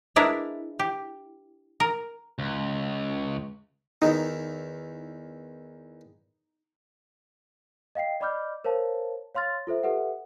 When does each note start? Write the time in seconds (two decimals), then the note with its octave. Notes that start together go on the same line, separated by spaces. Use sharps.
0.16 G#3 D4 E4 A#4 B4
0.79 G4
1.80 A#4
2.39 C#2
4.02 E2 D#3 D#4
7.95 D#5 F5 G5 C7
8.20 D5 D#5 B5 D6 F6 G6
8.64 A#4 C5 C#5 F5 A5
9.35 C#5 F5 C6 F6 A6
9.67 F4 A4 C5 E5
9.83 G4 A4 B4 E5 F#5